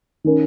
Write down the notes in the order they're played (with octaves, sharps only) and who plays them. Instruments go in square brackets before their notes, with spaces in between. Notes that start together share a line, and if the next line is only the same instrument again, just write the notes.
[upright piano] D#3 C#4 A#4